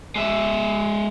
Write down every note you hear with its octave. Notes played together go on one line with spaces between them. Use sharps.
G#3 E5